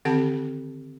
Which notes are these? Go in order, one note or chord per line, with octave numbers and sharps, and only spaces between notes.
D3 D#3 C4 G4 F#5 A5